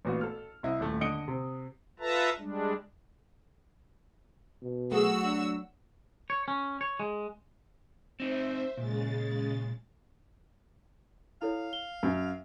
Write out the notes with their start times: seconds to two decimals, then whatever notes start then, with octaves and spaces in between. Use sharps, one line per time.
0.05 A1 A#2 B3 F#4
0.21 A4 F6
0.63 C2 E4 D#5
0.80 D#1 A3
1.01 D3 D#5 D#6 C#7 D7 G7
1.28 C3
2.00 F4 A4 B4 E5 A5 A#5
2.38 G3 G#3 D4
4.62 B2
4.92 F#3 A3 F#4 G#4 F#5 E6
5.23 D4
6.30 C#5
6.48 C#4
6.81 C#5
7.00 G#3
8.20 C4 D#4 C5 E5
8.77 A#2 C#3 G#3 A6
11.42 E4 A4 C#5 F5
11.73 G7
12.03 F#2